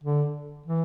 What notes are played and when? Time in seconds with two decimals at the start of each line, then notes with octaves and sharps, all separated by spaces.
0.04 D3
0.66 E3